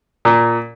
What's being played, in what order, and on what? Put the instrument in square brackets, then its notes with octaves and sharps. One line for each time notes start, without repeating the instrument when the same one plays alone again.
[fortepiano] A#2